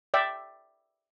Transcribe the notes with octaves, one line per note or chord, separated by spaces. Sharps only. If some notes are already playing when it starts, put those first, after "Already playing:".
D5 E5 G5